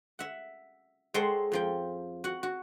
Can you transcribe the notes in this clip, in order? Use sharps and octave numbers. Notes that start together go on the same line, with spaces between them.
E5 F#5
G#3 A4 C5 C#5 F#5 G5
F2 F3 G5
F#4 F#5
F#4